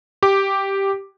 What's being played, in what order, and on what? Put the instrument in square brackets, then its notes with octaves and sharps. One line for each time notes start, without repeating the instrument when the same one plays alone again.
[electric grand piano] G4 D6